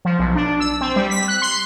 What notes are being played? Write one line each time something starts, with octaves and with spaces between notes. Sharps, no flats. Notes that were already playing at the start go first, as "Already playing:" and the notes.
F3
B1
D4
E6
C4
G3
B6
F#6
C6